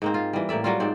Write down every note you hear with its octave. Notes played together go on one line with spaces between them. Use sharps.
G#2 A#3 C4
F4
E3 G3
A2 A#3 D5 E5
F#3 G3 F4
G#2 C4 D5